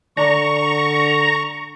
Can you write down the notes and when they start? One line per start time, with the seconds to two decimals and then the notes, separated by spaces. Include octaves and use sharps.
0.17 D3 D4 A#5 C#6